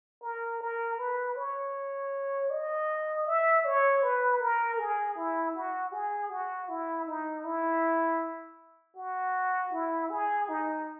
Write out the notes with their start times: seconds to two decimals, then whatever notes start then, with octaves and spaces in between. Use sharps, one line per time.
0.23 A#4
0.61 A#4
0.98 B4
1.36 C#5
2.50 D#5
3.27 E5
3.65 C#5
4.03 B4
4.40 A#4
4.79 G#4
5.16 E4
5.55 F#4
5.92 G#4
6.30 F#4
6.69 E4
7.07 D#4
7.44 E4
8.97 F#4
9.72 E4
10.10 G#4
10.49 D#4